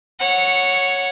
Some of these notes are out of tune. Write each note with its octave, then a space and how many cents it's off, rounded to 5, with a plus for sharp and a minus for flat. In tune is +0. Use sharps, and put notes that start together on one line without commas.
C#5 +0 F#5 -10